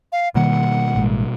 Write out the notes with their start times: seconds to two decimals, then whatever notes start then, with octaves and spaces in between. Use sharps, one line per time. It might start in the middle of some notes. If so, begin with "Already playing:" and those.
0.12 F5
0.35 B2 D#3 G3 A#3 F#5
0.95 A1 G#3